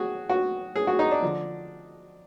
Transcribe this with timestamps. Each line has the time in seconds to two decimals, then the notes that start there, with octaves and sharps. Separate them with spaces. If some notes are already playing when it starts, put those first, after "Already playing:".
Already playing: F#4 G#4
0.30 F#4
0.76 G#4
0.87 F#4
0.99 D#4
1.11 D4
1.22 D3 F3